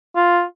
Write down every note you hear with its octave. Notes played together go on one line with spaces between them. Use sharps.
F4